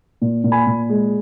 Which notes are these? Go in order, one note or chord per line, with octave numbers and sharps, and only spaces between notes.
A#2
A#2
G#5 B5
A#2
G#3